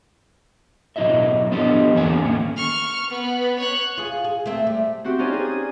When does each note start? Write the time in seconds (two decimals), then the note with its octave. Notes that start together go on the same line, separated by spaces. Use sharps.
0.96 B2 F#3 E4 F#4 D#5 E5
1.51 F3 B3 D4 G4 A4 D#5
1.95 E2 D3 A#3 C4 G#5
2.23 D#3 A3 A#3 C#4
2.57 C#6 F6
3.10 B3
3.59 C#5 F#6
3.98 F4 G#4
4.24 G#4
4.46 A3 C4
4.67 G3
5.04 C4 F#4 G4
5.19 C#4 D#4 F4 C5 D5 G#5
5.33 G#4
5.45 D#6